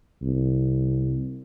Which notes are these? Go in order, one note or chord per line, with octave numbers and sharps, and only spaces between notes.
C2